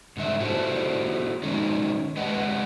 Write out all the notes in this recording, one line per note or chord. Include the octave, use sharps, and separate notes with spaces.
G#2 D3 G3 E5
E4 F#4 G4 A4 C5
D#3 F#3 G#3 C#4 D#4
G#3 G4 B4 D#5 F#5